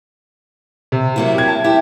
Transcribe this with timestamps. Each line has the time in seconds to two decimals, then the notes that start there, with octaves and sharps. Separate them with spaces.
0.92 C3
1.16 F#3 A#3 E4
1.34 G4 G#6
1.48 A5
1.64 E4 G4